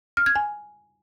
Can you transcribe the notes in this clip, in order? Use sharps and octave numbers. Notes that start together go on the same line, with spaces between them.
F6
G#6
G#5